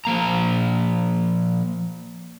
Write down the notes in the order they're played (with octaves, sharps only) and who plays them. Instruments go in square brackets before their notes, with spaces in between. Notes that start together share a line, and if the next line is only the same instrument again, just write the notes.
[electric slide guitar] F3 A#3 A#5